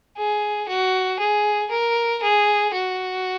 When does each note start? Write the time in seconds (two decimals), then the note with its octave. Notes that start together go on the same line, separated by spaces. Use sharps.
0.17 G#4
0.68 F#4
1.19 G#4
1.71 A#4
2.22 G#4
2.73 F#4